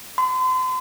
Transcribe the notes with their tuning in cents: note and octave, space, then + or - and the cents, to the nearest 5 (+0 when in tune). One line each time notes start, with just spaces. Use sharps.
C6 -40